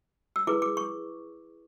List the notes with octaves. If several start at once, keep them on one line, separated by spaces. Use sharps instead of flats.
E6
E4 G#4 B4 D6
D6
C#6